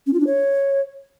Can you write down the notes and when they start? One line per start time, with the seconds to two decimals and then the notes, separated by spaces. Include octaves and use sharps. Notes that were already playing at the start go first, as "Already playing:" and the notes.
0.07 C#4
0.13 F4
0.20 D4
0.27 C#5